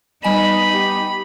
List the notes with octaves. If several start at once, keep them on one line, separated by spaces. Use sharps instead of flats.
G3 B3 D#4 D#5 G#5 B5 E7
G4